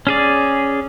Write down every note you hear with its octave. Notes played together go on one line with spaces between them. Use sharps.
C#4 G#4 D5